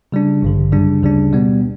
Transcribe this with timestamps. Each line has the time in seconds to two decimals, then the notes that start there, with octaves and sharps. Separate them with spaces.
0.12 C#3 G3 D4
0.43 A1 G2 D3
0.73 F#2 C#3 G3 D4
1.03 D2 C#3 G3 D4
1.33 B2 G3 B3